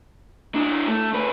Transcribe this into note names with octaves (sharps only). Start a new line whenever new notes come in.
D4 E4
A3
D2 B4